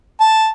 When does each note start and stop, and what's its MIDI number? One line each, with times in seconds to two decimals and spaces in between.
0.21 0.49 81